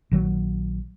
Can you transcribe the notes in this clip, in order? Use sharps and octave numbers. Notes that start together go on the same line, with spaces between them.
A#1 D#3 F#3